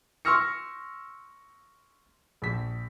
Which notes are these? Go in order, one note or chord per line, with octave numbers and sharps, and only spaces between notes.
C6 C#6 E6 F6 A#6 C#7
A#1 B6